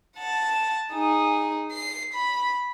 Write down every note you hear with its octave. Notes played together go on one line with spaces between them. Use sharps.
F#5 A5
D#4 G#4
C7
B5